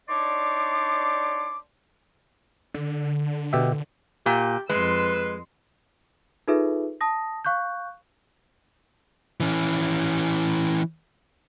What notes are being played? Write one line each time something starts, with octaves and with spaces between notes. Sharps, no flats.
D4 D#4 C#5 D5 C6 D6
D3
B2 G4 E5
A#2 G4
F2 G#3 B4 C6 E6
D#4 F4 G#4 A4 B4 E5
A5 D#6 A#6
F5 C#6 F#6 G6
E3 C#4